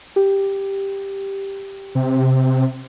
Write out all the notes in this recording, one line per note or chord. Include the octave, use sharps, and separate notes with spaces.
G4
C3